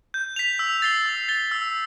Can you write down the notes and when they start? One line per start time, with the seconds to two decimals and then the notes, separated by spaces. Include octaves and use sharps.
0.14 G6
0.36 B6 F7
0.59 E6
0.82 A6 C7 G7
1.06 E6
1.29 A6 C7 G7
1.51 E6